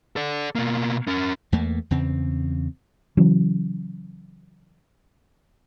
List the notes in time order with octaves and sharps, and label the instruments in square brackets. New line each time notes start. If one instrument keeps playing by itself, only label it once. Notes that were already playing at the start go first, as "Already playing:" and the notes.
[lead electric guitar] A4 D5
B2 A#3
C#4 A#4
[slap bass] E2 A3 A#3
E2 C#3 C4
[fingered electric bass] C#3 E3 F#3 C#4